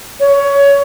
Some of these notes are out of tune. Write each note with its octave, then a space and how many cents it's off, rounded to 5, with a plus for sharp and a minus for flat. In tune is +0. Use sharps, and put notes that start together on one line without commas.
C#5 +20